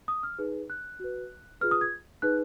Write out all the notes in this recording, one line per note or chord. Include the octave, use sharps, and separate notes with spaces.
D#6
F6
D#4 G#4 B4
F#6
F#4 B4
F4 G#4 B4 F6
D#6
G#6
D#4 G#4 B4 F#6